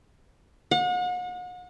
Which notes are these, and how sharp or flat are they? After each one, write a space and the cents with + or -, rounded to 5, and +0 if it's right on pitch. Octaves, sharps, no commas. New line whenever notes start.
F#5 -40